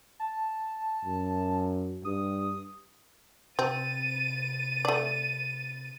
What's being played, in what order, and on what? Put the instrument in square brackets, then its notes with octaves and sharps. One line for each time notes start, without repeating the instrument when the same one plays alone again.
[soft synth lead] A5
[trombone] F#2
[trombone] G2 [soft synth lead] D#6
[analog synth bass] C3 [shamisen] C4 [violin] A6 D#7
[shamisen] A3 D5